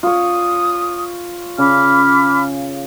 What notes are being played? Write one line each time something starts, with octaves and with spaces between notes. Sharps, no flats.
F4 C#5 D#6
C#3 B5 D6 F6